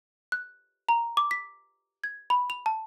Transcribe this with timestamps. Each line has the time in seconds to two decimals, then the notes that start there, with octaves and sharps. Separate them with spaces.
0.32 F#6
0.89 A#5
1.17 D6
1.31 B6
2.04 G#6
2.30 B5
2.50 F7
2.66 A5